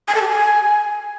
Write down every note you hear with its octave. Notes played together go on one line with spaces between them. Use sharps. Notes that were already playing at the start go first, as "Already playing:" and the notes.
G#5
A4
G4
G#5